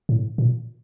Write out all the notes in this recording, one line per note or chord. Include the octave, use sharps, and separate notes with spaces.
A2
A#2